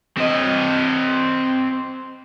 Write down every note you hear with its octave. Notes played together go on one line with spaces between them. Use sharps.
C4 D#5